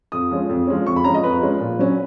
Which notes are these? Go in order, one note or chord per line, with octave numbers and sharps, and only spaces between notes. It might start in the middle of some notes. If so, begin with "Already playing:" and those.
F2 D#6
F3 G#3 C#4
F2
F3 G#3 C#4
F2 C#6
B5
F3 G#3 C#4 A#5
D#5
F2 B4
F3 G#3 C#4
A#2
F#3 C#4